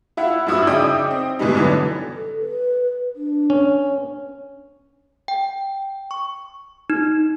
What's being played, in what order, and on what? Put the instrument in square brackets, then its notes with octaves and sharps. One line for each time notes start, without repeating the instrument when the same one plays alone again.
[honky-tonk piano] E4 F4 E5 F#5
G2 F3 E4 F#4 D#6 E6
C#3 D#4 D5 E5 G5 D#6
C4
G#2 B2 E3 G3 D#4
D3 E3 F#3 B3
[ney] A4
B4
D4
[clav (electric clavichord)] C#4
[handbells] G5
C#6
D#4